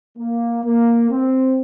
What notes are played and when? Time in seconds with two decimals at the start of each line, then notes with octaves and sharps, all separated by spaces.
0.18 A#3
0.64 A#3
1.11 C4